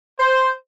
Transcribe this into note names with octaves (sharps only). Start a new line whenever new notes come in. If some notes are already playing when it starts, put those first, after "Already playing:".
C5